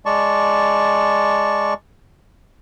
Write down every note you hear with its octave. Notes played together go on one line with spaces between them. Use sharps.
G#3 D5 A5 C#6